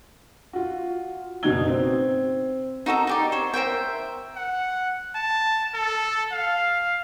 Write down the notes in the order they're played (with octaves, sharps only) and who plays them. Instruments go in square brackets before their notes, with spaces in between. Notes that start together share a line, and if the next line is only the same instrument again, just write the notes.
[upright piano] F4 F#4
F#1 B2 D4 D#4 G#6 G7
C4
[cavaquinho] D#4 F#4 A4 A#5
D#4 G4 D5
C5 C#5
A#4 C5 E5 G5
[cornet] F#5
A5
A4
F5